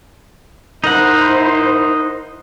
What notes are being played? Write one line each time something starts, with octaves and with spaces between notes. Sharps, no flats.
D#4 E4 A#4 C5 F#5